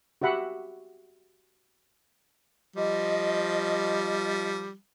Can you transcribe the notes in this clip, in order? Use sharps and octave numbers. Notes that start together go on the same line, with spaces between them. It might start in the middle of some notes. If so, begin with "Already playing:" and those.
F#4 G4 E5 F#5 B5
F3 G3 D#5